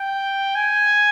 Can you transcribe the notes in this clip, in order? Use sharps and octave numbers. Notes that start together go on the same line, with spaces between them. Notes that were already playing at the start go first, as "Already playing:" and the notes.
Already playing: G5
G#5